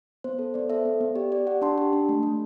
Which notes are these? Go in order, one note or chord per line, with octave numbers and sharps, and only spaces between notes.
B3 C5
A4
B3 D5
A4 C5 E5
B3
B3
G4 D5
G4 D5
G4 D5 F#5
D4 A5 C6
G4
D4
A3
A3